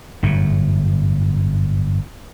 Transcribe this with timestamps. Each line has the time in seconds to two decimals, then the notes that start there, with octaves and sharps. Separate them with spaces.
0.23 G1 F#2 A2